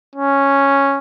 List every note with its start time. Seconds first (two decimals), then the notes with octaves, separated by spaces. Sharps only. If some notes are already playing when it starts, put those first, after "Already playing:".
0.16 C#4